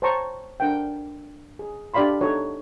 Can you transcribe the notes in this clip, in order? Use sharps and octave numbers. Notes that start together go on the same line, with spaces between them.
C5 C#5 A5 A#5 C#6
D4 A#4 F#5 G5
G#4
D4 G4 D5 F5 B5 C6
D#4 F#4 A4 C#5